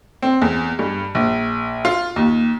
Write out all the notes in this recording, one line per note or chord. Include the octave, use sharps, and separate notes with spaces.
C4
E2
G2
A#1
F4
D#2